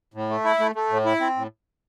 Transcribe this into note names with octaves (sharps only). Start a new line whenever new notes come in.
A2
A3
E4
A3
A3
A2
E4
C4
A2